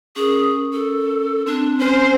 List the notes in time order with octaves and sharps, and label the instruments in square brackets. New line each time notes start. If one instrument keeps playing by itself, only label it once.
[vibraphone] C#4 A#4 [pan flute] G#4
[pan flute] A4
[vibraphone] C4 [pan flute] D4
[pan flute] C#4 [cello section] C5